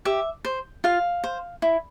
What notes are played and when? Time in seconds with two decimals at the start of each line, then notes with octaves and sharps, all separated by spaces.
0.05 G4 E5
0.45 C5
0.84 F4 F5
1.24 C5
1.62 E4